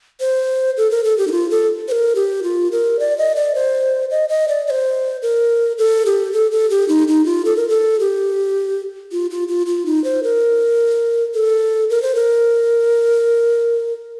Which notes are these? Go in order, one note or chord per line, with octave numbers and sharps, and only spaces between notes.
C5
A4
A#4
A4
G4
D#4
F4
A4
C5
A#4
G4
F4
A#4
D5
D#5
D5
C5
D#5
D#5
D5
D5
C5
A#4
A4
G4
A4
A4
G4
D#4
D#4
F4
A4
A#4
A4
G4
F4
F4
F4
F4
D#4
C5
A#4
A4
A#4
C5
A#4